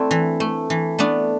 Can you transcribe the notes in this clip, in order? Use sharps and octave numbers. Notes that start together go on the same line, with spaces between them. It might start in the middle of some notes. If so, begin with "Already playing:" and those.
Already playing: A3 C4 D4 E4
E3
A3
E3
A3 B3 D4